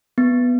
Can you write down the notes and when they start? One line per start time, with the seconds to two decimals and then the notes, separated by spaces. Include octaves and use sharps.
0.18 B3